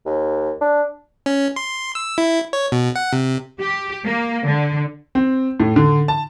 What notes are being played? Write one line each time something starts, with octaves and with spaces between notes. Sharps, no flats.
D#2
D4
C#4
C6
E6
E4
C#5
B2
F#5
C3
G4
A#3
D3
C4
A2
D3
A5